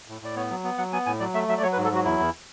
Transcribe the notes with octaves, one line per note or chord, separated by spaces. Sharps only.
A2
A2 D5
B3 C#5
F#3
B3
F#3 F#5
B3 G#5
A2 G#5
F#3 D5
A3 E5
F#3 E5
D5
F#3 C#5
B4
G#2
A4
F#3 F#4
E2 E4
E2